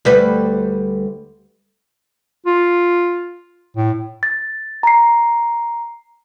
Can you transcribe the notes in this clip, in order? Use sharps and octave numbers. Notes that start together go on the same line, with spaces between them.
D2 G3 B4
F4
A2
A6
A#5 C7